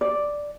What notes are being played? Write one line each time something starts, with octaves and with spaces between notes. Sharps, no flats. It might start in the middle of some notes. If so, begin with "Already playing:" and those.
D5